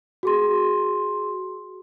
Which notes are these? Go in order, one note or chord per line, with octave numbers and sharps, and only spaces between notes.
F#4 G#4 C6